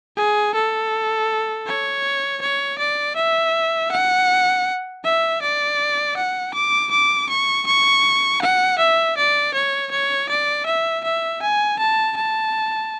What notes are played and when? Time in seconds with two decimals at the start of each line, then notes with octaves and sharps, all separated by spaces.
0.17 G#4
0.54 A4
1.67 C#5
2.42 C#5
2.78 D5
3.16 E5
3.91 F#5
5.04 E5
5.42 D5
6.17 F#5
6.54 D6
6.91 D6
7.29 C#6
7.66 C#6
8.41 F#5
8.78 E5
9.17 D5
9.54 C#5
9.91 C#5
10.29 D5
10.66 E5
11.04 E5
11.42 G#5
11.79 A5
12.16 A5